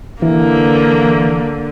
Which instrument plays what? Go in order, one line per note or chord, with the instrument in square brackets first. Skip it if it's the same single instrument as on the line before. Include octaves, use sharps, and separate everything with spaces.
[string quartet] D3 [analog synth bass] E3 [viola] A#3